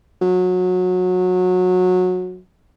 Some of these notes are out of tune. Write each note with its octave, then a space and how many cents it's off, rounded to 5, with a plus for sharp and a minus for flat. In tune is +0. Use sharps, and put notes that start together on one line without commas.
F#3 -20